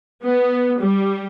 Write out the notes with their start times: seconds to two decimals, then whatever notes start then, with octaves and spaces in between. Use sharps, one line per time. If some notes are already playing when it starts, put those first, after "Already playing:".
0.24 B3
0.80 G3